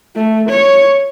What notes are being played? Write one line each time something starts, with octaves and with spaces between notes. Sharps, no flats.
A3
C#5